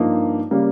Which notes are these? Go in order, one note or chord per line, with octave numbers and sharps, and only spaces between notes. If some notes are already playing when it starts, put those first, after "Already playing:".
Already playing: G2 F3 A#3 D#4
C#3 G3 A#3